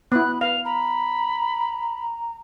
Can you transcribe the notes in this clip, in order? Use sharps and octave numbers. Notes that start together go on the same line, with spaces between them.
B3 E4 B5 F#6
B4 F5 F7
A#5 B5